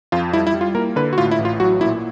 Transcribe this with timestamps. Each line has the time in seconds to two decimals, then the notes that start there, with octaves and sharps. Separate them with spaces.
0.12 F2 F4
0.33 G3 E4
0.47 E4
0.54 G3
0.61 F4
0.75 A#3 A#4
0.96 D3 B4
1.13 F#4
1.18 A2 F4
1.31 E4
1.39 A1
1.45 F4
1.60 F#3 F#4
1.81 A#2 E4